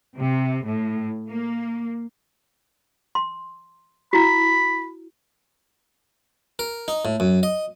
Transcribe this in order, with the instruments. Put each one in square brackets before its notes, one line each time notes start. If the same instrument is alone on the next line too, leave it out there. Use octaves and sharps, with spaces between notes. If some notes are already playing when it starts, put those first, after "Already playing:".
[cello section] C3
A2
A#3
[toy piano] C6
[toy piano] E4 F#4 [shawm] B5
[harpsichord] A#4
D#4
A2
F#2
D#5